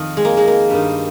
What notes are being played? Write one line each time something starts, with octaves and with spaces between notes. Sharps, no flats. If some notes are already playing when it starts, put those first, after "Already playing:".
Already playing: F2 D#3
G#3
A#3
G#3
A#3
G2 D#3